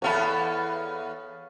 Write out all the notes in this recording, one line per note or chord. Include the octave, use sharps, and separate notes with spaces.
E2 B3 A4 C#5 F5 B5